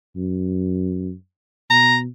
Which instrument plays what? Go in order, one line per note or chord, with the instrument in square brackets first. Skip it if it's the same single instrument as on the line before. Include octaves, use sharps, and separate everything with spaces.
[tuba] F#2
[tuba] B2 [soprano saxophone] A#5